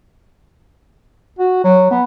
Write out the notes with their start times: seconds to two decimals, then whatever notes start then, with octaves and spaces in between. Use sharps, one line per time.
1.39 F#4
1.64 F#3
1.91 B3